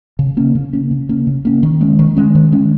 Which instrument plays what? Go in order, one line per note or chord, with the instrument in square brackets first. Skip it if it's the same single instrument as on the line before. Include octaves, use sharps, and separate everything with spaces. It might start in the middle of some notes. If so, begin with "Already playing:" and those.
[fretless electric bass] C#3
A#3 C#4
C#3
A#3 C#4
C#3
A#3 C#4
C#3
A#3 C#4
D#3
G#3 C#4
D#3
G#3 C#4
D#3
G#3 C#4